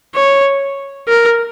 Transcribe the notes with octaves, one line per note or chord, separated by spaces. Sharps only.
C#5
A#4